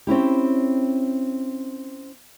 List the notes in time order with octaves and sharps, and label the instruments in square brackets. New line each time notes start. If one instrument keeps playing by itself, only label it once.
[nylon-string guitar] C4 C#4 E4 G4